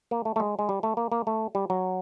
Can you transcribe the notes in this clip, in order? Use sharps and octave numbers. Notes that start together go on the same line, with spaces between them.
A#3
A3
A3
G#3
G#3
G3
A3
A#3
A#3
A3
G3
F#3